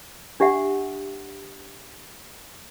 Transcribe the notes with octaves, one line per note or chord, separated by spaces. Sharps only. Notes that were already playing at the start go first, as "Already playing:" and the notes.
D4 G4 E5 F#5